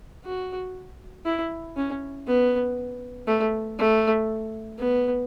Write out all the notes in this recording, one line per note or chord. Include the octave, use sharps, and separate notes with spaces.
F#4
E4
C#4
B3
A3
A3
B3